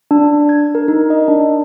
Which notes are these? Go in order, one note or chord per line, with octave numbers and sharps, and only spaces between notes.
D4
D4
G#6
A#4
D#4
D#5
D4